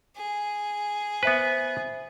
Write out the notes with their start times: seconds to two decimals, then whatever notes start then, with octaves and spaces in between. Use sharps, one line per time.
0.16 G#4
1.23 B3 B4 C5 E5